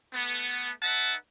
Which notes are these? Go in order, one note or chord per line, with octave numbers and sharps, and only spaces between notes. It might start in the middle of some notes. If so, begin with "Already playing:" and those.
A3 B3
D#4 B4 E5 F#5 A5